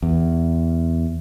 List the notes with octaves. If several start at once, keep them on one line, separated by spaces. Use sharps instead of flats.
E2